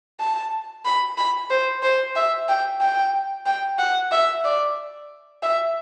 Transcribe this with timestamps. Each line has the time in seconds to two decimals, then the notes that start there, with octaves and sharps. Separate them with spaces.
0.20 A5
0.85 B5
1.18 B5
1.50 C5
1.83 C5
2.15 E5
2.49 G5
2.81 G5
3.46 G5
3.78 F#5
4.12 E5
4.44 D5
5.43 E5